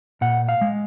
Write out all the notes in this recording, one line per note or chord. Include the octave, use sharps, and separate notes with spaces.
A#2 F#5
F5
G#3